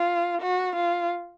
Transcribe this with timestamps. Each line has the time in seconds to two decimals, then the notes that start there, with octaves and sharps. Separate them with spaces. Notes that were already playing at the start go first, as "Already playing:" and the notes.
Already playing: F4
0.42 F#4
0.75 F4